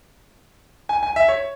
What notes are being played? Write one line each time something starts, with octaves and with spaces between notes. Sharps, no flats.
G#5
G#5
E5
C#5